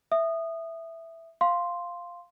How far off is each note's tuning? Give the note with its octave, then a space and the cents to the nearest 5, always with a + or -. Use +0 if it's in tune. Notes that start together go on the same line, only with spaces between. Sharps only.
E5 +0 D#6 -20
F5 +0 C6 +0